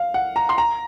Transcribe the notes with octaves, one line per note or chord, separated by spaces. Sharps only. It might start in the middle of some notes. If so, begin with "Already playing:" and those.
Already playing: F5
F#5
A#5
C6
A#5